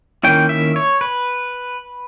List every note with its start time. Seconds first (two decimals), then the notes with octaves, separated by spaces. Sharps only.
0.23 D#3 G3 A#3 C#4 E4 G5
0.49 E5
0.76 C#5
1.01 B4